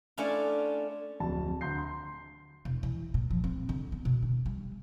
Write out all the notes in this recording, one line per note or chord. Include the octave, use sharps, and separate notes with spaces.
A3 C#4 D4 E4 F4
D1 F2 A5
D2 A#5 C6 G6 C7
C6
E1
E3
A#2
F3
C4
D3
B3
B2
D3
G3